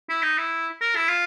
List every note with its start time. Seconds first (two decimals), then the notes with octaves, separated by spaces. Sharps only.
0.09 E4
0.23 D#4
0.38 E4
0.81 A#4
0.96 E4
1.09 F4